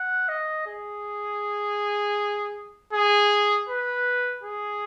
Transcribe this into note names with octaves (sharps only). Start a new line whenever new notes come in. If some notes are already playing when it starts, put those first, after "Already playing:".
Already playing: F#5
D#5
G#4
G#4
B4
G#4